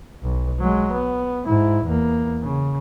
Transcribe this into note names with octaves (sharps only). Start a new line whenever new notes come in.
B1
F#3 G#3
B3
G#2 E4
E2 A#3
C#3